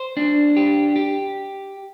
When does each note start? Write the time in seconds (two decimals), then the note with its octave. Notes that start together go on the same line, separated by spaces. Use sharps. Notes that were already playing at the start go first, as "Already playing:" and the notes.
Already playing: C5
0.17 D4
0.56 G4
0.96 G4